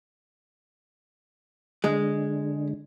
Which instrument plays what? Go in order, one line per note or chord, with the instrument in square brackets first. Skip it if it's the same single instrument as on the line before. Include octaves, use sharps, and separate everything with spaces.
[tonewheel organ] D3 [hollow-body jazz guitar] G#3